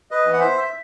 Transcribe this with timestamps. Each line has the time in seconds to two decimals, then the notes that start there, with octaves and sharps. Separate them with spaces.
0.11 B4 D#5
0.25 E3 B3
0.33 F#5
0.40 C5 E5
0.58 E5